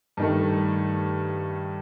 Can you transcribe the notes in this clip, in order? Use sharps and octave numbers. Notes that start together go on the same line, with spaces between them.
G2 D#3 A3